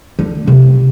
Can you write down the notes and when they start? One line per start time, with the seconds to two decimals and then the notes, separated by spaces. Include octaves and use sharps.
0.19 D3
0.47 C3